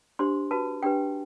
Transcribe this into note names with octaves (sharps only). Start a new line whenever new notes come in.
D4 G4 C5 C6
F#4 B4 A5
D4 G4 B4 G5